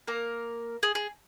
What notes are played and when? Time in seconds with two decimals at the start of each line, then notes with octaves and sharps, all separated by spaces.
0.07 A#3 A#4
0.83 G#4
0.95 G#4